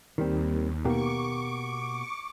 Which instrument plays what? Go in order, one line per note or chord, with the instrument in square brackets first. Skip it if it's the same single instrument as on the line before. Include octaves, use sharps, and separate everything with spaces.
[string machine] D#2 [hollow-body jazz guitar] D#3 G3 C4
[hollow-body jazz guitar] B2 A#3 G4 [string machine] C#6 D6